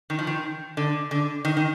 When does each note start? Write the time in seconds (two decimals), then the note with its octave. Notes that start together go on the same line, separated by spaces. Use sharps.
0.10 D#3
0.19 F3
0.27 D#3
0.77 D3
1.11 D3
1.45 D#3
1.57 D#3